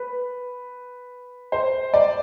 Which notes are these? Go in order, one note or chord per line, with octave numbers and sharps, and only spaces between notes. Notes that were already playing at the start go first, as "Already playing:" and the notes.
Already playing: B4
C5
D5